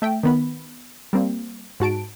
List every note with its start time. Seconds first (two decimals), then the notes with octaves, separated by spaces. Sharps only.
0.02 A3 E5 G5
0.23 D#3 B3 B5
1.13 G3 A#3 C4
1.80 G#2 F#4 A5 D7